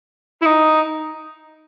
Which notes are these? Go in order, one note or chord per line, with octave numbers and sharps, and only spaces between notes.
E4
D#4